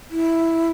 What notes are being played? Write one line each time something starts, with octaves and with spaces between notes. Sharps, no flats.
E4